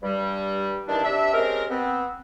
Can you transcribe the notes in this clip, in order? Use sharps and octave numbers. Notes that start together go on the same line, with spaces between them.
G2 G3
D#3 E3 G3 D4
C3 D4 E5
G#3 C4 C#4 G4 A#4
B3 C4